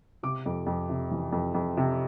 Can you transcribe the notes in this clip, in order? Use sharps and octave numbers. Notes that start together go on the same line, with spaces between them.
C3 D6
F2
F2
C3
E3
F2
F2
C3